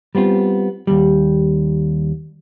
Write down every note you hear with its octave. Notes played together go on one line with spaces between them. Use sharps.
G3 B3 C4 F4
D#2 G3